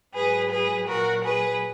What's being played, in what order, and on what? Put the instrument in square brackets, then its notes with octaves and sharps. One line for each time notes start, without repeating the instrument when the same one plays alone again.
[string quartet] G#2 F#3 G#4 B4
G#4 B4
A#2 F#3 F#4 A#4
G#4 B4